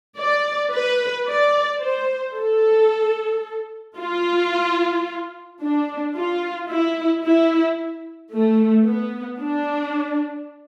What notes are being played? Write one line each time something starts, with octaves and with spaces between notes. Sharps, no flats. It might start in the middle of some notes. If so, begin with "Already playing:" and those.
D5
B4
D5
C5
A4
F4
D4
F4
E4
E4
A3
B3
D4